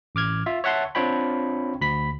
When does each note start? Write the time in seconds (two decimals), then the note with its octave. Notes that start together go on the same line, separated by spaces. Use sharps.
0.15 A1 D6 F6 G#6
0.46 F4 E5
0.64 C#5 E5 F#5 A5 C6
0.95 C4 D4 F4 C#5 G5 B5
1.81 D2 B5 B6